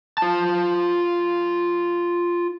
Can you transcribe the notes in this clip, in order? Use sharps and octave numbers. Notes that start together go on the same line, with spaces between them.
F4 A5